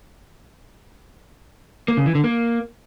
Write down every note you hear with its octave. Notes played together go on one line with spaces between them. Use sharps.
A#3
C#3
E3
D3
A#3